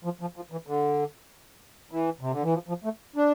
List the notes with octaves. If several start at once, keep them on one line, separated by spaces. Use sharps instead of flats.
F3
F3
F3
E3
D3
E3
C3
D3
E3
F3
F3
A3
D4